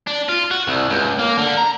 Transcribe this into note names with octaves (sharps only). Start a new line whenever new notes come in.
D4
F4
F#4
C2
C#2
A#3
D3
A#5